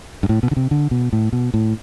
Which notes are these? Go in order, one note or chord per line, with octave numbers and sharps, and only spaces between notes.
G2
A2
B2
D3
C3
D3
B2
A2
B2
A2